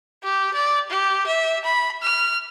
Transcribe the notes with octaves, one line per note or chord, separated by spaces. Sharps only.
G4
D5
G4
E5
B5
F6